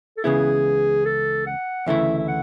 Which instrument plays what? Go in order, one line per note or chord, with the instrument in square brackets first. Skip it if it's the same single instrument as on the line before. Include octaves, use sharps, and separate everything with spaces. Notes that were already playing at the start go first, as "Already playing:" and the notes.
[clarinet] A4
[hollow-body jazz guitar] C#2 C#3 E3 B3 E4 [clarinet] G#4
[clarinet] A4
F#5
[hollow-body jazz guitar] D2 C#3 E3 A3 E4 [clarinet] E5
[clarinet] E5
F#5